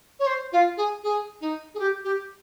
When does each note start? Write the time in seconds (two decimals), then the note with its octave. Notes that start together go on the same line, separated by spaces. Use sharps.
0.19 C#5
0.26 C5
0.52 F4
0.77 G#4
1.03 G#4
1.41 D#4
1.74 G#4
1.79 G4
2.04 G4